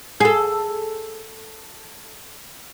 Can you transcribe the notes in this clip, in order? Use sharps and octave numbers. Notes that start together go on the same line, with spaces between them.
G#4 A4